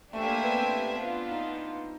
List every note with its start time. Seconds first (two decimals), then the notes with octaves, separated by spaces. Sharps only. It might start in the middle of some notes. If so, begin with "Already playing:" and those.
0.12 A3 D4 G4 C5 E5 G#5
0.22 A#3
0.42 B3
0.53 C4
0.92 B3 D4 F4
1.31 D#4